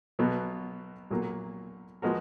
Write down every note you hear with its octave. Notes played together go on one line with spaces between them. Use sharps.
B1 B2 F#3 B3
B1 A#2 F#3 A#3
F3 G#3 B3 F#4 A#4